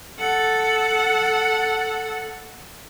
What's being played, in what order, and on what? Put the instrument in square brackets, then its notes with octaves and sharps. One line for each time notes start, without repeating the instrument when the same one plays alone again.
[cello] A4 F#5